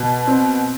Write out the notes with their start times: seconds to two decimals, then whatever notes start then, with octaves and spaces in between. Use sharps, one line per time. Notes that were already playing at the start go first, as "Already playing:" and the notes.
Already playing: B2
0.27 C4